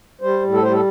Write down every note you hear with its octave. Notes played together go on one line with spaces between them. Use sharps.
G3 C5
A2
A4
G3 C5
A4